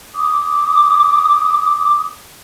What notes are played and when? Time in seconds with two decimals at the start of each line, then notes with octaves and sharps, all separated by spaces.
0.15 D6 D#6